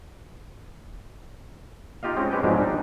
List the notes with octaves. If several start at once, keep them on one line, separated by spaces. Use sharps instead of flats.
D#4 F4 G4 D#5 F5
G#3 C4 C#4 D#5 G5
G#3 C#4 G4 B4 G5
G#2 B2 F3 F#3 G#3 D4
G3 D4 D#4